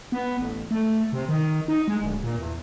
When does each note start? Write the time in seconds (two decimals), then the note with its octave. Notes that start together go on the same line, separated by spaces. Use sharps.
0.12 B3
0.39 A1
0.71 A3
1.13 C3
1.29 D#3
1.68 D#4
1.88 G#3
2.01 D1
2.24 A#2
2.38 E2